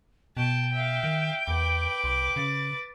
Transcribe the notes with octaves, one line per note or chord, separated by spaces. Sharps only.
B2 G5 A5
E5 F5
D#3
E2 B4 D6
C2 G5
C#3 A6